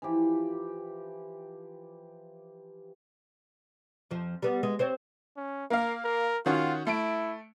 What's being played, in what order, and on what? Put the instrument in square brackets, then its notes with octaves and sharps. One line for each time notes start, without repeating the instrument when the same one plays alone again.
[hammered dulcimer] E3 F3 G4
[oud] F2 F3
G3 B3
G#3 B3
C4 C5 C#5
[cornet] C#4
[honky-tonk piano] A#3 F5 [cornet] A#4
[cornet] A#4
[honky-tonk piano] D#3 C#4 F#4 [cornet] F4
[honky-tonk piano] A3 D7 [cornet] E4